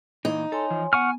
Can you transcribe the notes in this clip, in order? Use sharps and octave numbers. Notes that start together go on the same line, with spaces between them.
A#2 E3 D#4
A4 C#5 G#5 C6
E3 F3
B3 F#5 G#5 C#6 F6